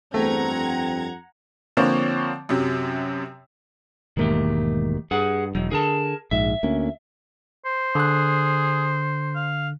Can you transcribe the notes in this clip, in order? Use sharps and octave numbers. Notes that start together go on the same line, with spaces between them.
E2 G2 A3 C4 F#5 A#5 G#6
F2
D3 F3 A#3 C4 C#5
F#2 C3 F#3
E1 G#2 D#3 A3 A#3 G4
G2 G#4 F#5
E1 F#3 D#4
D3 G#4 A#4 A5
A#1 G#2 E5
D2 A#3 C#4
C5
D3 G#4 F#6
F5